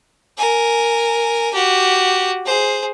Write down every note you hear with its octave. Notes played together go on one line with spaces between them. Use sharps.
A#4 G#5
F#4 G4
G#4 C5